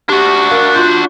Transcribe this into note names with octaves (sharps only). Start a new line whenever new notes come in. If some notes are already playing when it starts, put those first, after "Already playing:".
D4 F#4 G4
A#4 F5
F4 C6 G6